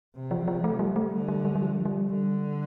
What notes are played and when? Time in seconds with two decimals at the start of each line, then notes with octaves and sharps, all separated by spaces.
0.15 C3
0.31 F3
0.48 F3
0.64 A3
0.79 G3
0.96 A3
1.12 D3
1.28 G3
1.45 G3
1.55 G3
1.61 F3
1.85 G3
2.10 D3